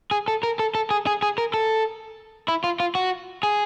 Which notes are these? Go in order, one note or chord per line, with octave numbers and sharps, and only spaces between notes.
G#4
A4
A#4
A4
A4
G#4
G#4
G#4
A#4
A4
E4
F4
F4
F#4
G#4